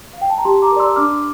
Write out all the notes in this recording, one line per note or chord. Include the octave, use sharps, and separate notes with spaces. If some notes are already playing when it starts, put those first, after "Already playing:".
F5
G5
A5
A#5
G4 A5 C6
A#5 D6
A#4
D5 C6 E6
D4 D6 F6